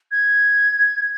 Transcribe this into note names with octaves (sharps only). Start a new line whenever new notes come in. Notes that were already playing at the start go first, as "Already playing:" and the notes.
G#6